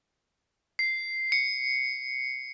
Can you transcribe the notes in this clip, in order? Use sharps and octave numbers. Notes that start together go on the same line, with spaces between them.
C7
C#7